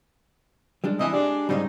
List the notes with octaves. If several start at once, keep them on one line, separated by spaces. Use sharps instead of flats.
G3 G#3 D4
C3 E3 D#5 E5 G#5
G#3 D4 G4
G#2 C#3 G3 C4 D#4